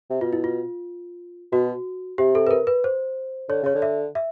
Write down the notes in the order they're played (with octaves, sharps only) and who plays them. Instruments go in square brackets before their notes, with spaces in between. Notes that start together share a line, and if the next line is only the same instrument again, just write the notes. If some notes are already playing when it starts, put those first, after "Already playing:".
[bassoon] C3
[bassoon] B2 [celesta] F4
[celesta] E4
F4
[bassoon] B2 [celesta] F#4
[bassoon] C3 [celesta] G4
[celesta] A4
B4
A#4
B4
C5
[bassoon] D3 [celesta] C#5
[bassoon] C#3 [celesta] C#5
[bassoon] D3
[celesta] E5
E5